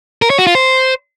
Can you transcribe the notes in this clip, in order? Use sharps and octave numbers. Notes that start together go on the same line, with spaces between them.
A#4
C#5
F#4
F4
C5